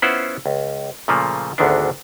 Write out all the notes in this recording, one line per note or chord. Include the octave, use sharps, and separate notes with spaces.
B3 C#4 E4 F4 C5 F#5
C#2
A#2 C#3 F3 A3 A#3
G#1 D2 D3 D#3 B3 D4